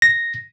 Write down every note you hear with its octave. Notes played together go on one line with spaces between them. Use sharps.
A#6